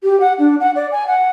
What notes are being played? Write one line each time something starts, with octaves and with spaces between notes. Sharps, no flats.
G4
F#5
D4
F#5
D5
G#5
F#5